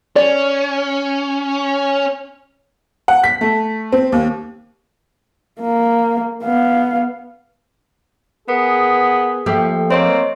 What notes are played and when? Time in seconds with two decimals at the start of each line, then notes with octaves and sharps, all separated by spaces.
0.16 C#4 D5
3.08 F#5
3.24 B6
3.41 A3
3.92 C4
4.12 D#2
5.61 A#3
6.44 B3 F5
8.48 B3 G#4 A#4
9.46 F3 A3 A#3 G4
9.91 A#3 C4 C#5 D#5 C6